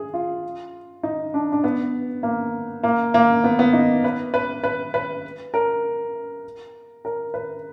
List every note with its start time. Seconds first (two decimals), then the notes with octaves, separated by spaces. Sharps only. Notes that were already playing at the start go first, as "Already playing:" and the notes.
Already playing: G#4
0.14 F4
1.03 D#4
1.34 D4
1.52 D4
1.64 B3
2.23 A#3
2.83 A#3
3.14 A#3
3.44 B3
3.59 B3
3.73 D#4
4.04 B4
4.34 B4
4.64 B4
4.94 B4
5.54 A#4
7.05 A#4
7.34 B4